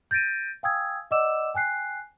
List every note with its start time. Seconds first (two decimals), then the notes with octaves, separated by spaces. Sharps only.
0.11 G6 A6 A#6 D7 D#7
0.63 F5 G5 G#5 D#6 E6 G#6
1.11 D5 D#5 F#5 D6 E6 E7
1.54 G5 G#5 F#6 C7